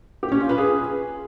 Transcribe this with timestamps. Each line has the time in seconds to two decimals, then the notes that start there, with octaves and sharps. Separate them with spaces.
0.23 G4
0.32 C#4
0.40 F4
0.49 B4
0.58 G#4